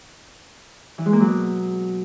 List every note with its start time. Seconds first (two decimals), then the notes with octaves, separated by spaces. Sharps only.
0.98 E3
1.06 G#3
1.13 A#3
1.20 F#3
1.28 B2